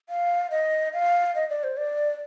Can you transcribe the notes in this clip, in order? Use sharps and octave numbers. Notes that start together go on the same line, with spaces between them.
F5
D#5
F5
D#5
D5
C5
D5